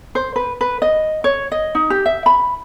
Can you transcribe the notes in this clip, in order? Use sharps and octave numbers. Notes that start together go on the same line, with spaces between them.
C5
B4
B4
D#5
C#5
D#5
D#4
G4
E5
B5